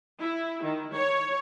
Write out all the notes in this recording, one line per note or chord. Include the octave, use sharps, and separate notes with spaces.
E4
D#3
C#5